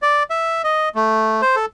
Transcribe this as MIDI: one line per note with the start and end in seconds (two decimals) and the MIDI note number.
0.02 0.23 74
0.30 0.62 76
0.64 0.89 75
0.95 1.41 57
1.42 1.56 72
1.56 1.65 69